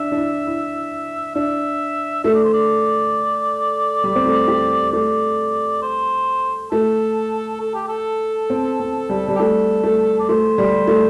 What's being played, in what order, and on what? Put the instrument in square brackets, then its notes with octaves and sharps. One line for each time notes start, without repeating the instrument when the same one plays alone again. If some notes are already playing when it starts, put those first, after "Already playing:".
Already playing: [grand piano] D4 [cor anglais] E5
[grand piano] D4
E4
E4
[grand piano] D4 [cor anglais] E5
[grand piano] A3 [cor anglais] E5
[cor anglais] D5
C5
D5
[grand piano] G3
C4
A3
G4
[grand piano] A3 [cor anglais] D5
[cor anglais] C5
[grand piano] A3 [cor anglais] A4
[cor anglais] A4
G4
A4
[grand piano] C4
C4
G3
G3
[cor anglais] G4
[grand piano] A3 [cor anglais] A4
[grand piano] A3
[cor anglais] D5
[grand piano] A3 [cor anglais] C5
[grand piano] G3
A3